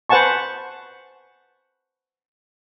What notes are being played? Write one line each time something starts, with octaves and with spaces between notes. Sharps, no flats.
B4 C5 F#5 G#5 A5 C#6